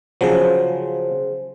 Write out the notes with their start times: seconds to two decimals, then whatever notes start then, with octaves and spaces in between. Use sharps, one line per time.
0.21 C#3 F3 F#3 G#4 C5